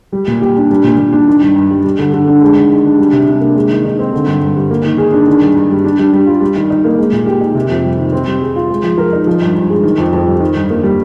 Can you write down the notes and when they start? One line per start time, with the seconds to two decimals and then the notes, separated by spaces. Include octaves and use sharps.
0.12 G3
0.28 A#2
0.41 G4
0.56 D4
0.71 G3
0.84 A#2
0.98 A#2
1.13 D4
1.27 D#3
1.42 G2
1.56 G2
1.70 G3
1.84 G3
1.99 D3
2.14 D3
2.28 D4
2.41 G#3
2.56 D#3
2.71 D#3
2.85 D4
2.98 G3
3.12 C3
3.28 D4
3.41 A#3
3.55 G#3
3.69 D#3
3.84 D#4
3.99 C4
4.13 D3
4.27 G2
4.42 G2
4.56 G3
4.71 A#3
4.85 D#3
4.98 G#4
5.12 D4
5.27 D#3
5.41 G2
5.55 G2
5.70 G3
5.84 D4
5.99 G3
6.13 G3
6.26 F4
6.41 G3
6.56 D#3
6.70 D#4
6.85 A#3
6.98 G#3
7.12 A#2
7.26 G4
7.41 D#4
7.55 C3
7.70 F2
7.84 G3
7.99 D#3
8.13 C4
8.27 G3
8.41 G#4
8.56 F4
8.70 G#3
8.83 F3
8.98 A#4
9.13 D#4
9.27 F3
9.42 G2
9.55 G2
9.70 G#3
9.83 D#3
9.98 F2
10.13 F2
10.27 G3
10.40 D#3
10.56 G2
10.70 A#3
10.83 G3